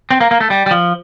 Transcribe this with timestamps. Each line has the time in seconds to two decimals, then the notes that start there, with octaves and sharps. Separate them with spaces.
0.11 C4
0.21 A#3
0.31 A#3
0.41 A3
0.50 G3
0.66 G3
0.71 F3